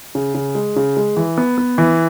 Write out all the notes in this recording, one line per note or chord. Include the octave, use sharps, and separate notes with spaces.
C#3
C#3
G#3
C#3
G#3
E3
B3
B3
E3